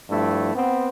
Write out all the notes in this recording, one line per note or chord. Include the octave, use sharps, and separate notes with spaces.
G2 F3 A3 E4
B3 C4